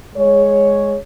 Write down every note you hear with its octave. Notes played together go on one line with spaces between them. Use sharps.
G#3 G#4 C#5